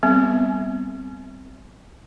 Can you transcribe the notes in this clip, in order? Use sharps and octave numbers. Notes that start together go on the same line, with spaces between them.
G3 B3 C4